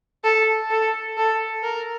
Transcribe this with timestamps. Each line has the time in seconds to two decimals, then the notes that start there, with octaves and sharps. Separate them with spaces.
0.24 A4
0.71 A4
1.18 A4
1.64 A#4